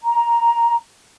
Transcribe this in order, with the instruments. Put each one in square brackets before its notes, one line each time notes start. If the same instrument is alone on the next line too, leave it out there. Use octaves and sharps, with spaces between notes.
[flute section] A#5